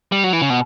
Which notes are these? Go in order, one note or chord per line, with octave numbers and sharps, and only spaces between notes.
G3
F#3
E3
C#3
B2